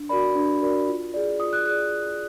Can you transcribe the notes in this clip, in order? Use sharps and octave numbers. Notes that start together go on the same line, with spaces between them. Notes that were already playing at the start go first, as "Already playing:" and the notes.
Already playing: D4
F#4 A#4 D5 B5
D4
F#4 A#4 D5
F4
G#4 D5
F4 D#6
F#6
G#4 D5 F#6